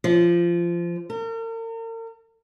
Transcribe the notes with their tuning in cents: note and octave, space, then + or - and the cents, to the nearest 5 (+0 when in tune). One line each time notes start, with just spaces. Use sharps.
F3 -20
A#4 -40